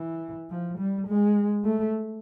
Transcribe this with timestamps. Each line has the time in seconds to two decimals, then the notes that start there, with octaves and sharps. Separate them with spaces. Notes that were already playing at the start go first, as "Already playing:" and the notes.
Already playing: E3
0.50 F3
0.78 G3
1.07 G#3
1.64 A3